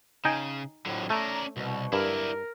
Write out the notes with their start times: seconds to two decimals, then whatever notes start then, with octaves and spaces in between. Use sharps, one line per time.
0.25 C#3 D#4 G5 G#5
0.86 F2 A2 D3 F#3
1.10 A3 C#4 D5 A#5
1.57 C2 B2
1.93 G2 E4 A#4 D5